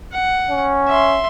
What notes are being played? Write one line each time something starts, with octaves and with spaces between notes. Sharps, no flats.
F#5
C#4
E5 C6